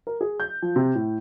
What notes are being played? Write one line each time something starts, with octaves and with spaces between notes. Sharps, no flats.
A#4
G#4
G6
F3
C3
A2